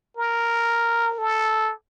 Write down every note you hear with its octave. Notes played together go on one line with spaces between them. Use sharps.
A#4
A4